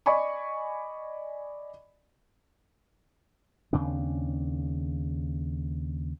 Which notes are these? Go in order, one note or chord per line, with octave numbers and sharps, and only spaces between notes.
D5 D#5 G#5 B5 C#6
D#2 C#3 C4 D4